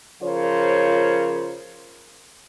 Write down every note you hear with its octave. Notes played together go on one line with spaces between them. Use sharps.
C#3 F3 F4 A#4 C5 C#5